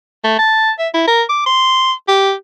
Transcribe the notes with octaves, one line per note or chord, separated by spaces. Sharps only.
A3
A5
E5
E4
A#4
D6
C6
G4